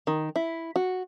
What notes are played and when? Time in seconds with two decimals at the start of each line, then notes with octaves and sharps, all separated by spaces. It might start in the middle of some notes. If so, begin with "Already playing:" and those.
0.07 D#3
0.36 E4
0.76 F#4